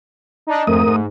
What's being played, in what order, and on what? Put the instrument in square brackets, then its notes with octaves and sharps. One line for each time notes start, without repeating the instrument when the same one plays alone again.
[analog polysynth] D4 D#4
[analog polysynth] F2 G#2 [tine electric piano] A3 [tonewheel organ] A#4 D#6
[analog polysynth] G#2